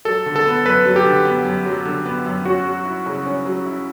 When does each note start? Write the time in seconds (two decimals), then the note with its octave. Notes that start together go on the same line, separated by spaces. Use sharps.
0.05 F#3 A4
0.26 D3
0.36 A4
0.46 B3
0.65 F#2 B4
0.86 F#3
0.96 G4
1.05 D3
1.25 B3
1.45 F#2
1.66 F#3
1.85 D3
2.05 B3
2.26 F#2
2.45 C#4 F#4
2.65 F#3
2.85 E4
3.06 C#3
3.26 C#4
3.45 F#3
3.66 E4